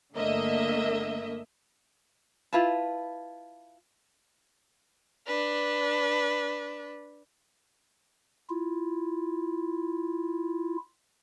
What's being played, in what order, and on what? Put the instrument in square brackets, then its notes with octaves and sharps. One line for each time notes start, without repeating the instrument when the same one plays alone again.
[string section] G1 D3 A3 A#3 D#5 E5
[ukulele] E4 F4 B4 A5
[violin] D4 B4
[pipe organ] E4 F4